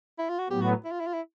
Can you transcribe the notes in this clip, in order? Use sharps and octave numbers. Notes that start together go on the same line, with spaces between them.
E4
F4
F#4
A2 F#3 B3 G4
F#4
E4
F4
E4
F4
E4